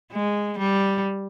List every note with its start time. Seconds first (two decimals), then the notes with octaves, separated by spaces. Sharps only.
0.12 G#3
0.59 G3